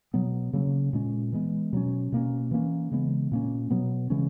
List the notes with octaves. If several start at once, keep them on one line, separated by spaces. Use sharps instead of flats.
B2 F#3 B3
C#3 F#3 A#3 C#4
A#2 G#3 C#4
E3 G#3 B3
B2 F#3 C#4
B2 A#3 C#4
E3 A#3 C#4
C#3 E3 G#3 B3
A#2 A#3 C#4
B2 F#3 B3
C#3 E3 G#3 C#4